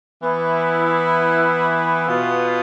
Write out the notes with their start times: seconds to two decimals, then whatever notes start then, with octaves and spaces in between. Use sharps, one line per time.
0.22 E3 B3 E4
2.07 B2 B3 F4